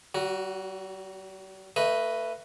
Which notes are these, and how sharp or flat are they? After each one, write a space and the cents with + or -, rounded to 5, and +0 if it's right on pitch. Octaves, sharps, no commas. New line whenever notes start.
G3 -45 F#4 +0
A3 +30 B4 +0 D#5 +0